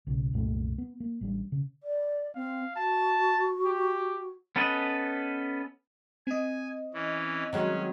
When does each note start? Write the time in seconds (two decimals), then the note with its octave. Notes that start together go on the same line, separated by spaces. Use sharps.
0.07 B1 C#3
0.34 C2 F#2 A#2 A3
0.78 B3
1.00 A#3
1.21 A1 G3 D4
1.52 C#3
1.83 D5
2.35 C4 F5
2.76 F#4 A5
3.65 G4
4.56 B3 C#4 A4 B4 D#5
6.27 C4 D#5 G#5
6.94 E3 C#4
7.53 D#3 F#3 G#3 C#4